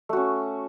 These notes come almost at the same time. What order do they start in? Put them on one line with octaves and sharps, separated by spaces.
A3 F#4 C#4